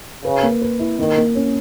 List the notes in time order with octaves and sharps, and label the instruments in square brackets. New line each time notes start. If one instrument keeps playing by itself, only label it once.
[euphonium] C#3 [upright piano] B4
[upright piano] A#3
B4
E4
[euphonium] D#3 [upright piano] A#3
[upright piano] A#3
C#4